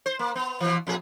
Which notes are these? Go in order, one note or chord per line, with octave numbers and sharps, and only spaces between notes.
C5
A#3
B3
B2 E3
F2 A#2 G#4